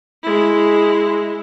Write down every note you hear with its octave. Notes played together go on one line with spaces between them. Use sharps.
G#3 E4